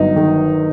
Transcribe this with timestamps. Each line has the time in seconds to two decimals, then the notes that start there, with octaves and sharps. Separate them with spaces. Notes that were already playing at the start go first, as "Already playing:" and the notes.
Already playing: G1 F#3 D#4
0.16 D#3